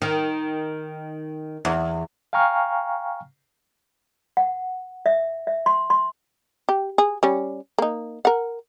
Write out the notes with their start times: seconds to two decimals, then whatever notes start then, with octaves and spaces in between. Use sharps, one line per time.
0.02 D#3
1.65 E2
2.33 F5 G5 G#5 A#5 C#6 F6
4.37 F#5
5.06 E5
5.47 E5
5.66 C6
5.90 C6
6.69 G4
6.98 G#4
7.23 G3 C#4
7.78 A#3 D#4
8.25 A#4 F#5